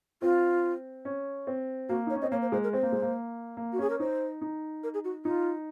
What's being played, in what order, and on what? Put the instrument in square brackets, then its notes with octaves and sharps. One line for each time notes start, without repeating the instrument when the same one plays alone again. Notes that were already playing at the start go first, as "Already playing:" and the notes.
[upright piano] C4 [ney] F4
[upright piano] C#4
C4
[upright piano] A#3 [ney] F#4
[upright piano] D#4 [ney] C#5
[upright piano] C#4
[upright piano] C4 [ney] D#5
[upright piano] A#3 [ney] C#5
[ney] C5
[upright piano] G#3 [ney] C5
[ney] A#4
[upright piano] C4 [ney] C5
[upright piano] A#3
G#3
A#3
A#3
[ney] F#4
[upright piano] C#4 [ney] G#4
[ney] A#4
[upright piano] D#4 [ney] C5
[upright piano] D#4
[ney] A#4
G#4
F#4
[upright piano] D#4 [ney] F4